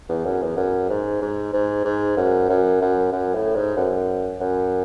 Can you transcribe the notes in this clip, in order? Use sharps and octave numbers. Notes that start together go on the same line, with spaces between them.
E2
F#2
E2
F#2
G#2
G#2
G#2
G#2
F#2
F#2
F#2
F#2
A2
G#2
F#2
F#2